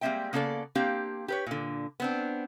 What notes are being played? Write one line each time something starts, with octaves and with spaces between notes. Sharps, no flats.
G3 G#3 A#3 C4 E5 G5
C#3 A#3 B3 A4 D5
A#3 C4 D4 G4 F5
G4 B4 C#5
A#2 D3
B3 C4 D4